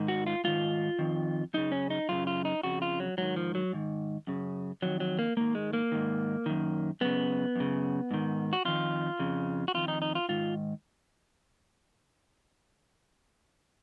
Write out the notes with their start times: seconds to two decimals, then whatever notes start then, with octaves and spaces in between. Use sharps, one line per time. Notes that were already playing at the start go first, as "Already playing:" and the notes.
Already playing: G#2 D#3
0.08 F#4
0.27 F4
0.44 G#2 D#3 F4
0.99 F2 D#3
1.54 F#2 C#3 D#4
1.72 C#4
1.90 D#4
2.09 F#2 C#3 F4
2.27 F4
2.45 D#4
2.63 F2 C#3 F#4
2.82 F4
3.00 F#3
3.18 G#2 D#3 F#3
3.36 F3
3.55 F#3
3.73 G#2 D#3
4.27 F#2 C#3
4.82 F2 D#3 F#3
5.00 F#3
5.19 A#3
5.37 G#2 D#3 A#3
5.55 G#3
5.73 A#3
5.92 G#2 D#3
6.46 F#2 D#3
7.01 F#2 C#3 B3
7.56 F#2 C#3
8.11 G#2 D#3
8.53 F#4
8.65 F2 D#3 F4
9.20 F2 C#3
9.68 F#4
9.74 F2 D#3 F4
9.88 D#4
10.02 D#4
10.15 F4
10.29 G#2 D#3 F4